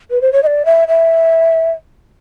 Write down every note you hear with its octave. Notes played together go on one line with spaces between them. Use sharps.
B4
C5
C#5
D#5
D5
E5
E5